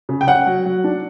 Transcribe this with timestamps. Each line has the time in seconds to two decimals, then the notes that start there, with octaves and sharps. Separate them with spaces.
0.09 C#3
0.21 G5
0.27 C#4 F#5
0.46 F#3
0.65 F#3
0.84 D4